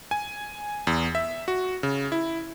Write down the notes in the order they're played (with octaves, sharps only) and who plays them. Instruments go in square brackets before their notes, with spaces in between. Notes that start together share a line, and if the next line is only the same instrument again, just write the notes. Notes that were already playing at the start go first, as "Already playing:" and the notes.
[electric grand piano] G#5
E2
E5
F#4
C#3
E4